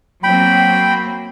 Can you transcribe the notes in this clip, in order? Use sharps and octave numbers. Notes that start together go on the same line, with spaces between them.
F#3 A#3 C4 G5 B5